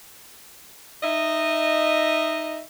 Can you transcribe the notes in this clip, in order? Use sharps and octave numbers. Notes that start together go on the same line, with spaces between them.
D#4 D#5 E5